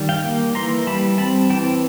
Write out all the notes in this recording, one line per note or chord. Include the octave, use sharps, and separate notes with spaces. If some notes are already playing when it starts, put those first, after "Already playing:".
Already playing: D#3 G3
F5 G5
A#3
E3 A#5 C6
G3 A5 B5
C4 A5 B5
E3 G5 A5